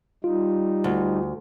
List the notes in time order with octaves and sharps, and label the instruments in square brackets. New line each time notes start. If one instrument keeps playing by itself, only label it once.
[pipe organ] G3 D#4 [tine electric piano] F4
[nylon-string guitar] D2